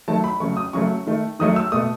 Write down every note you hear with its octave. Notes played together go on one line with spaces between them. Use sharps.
D#3 F#3 A3 A5
B5
C#3 F#3 A3 C#6
D#6
C#3 F#3 A3 C#6
D#3 A3
D#3 F#3 A3 D#6
E6
B2 A3 D#6